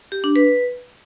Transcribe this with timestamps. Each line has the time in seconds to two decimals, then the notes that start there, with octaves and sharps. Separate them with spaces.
0.12 G4
0.24 D4
0.36 B4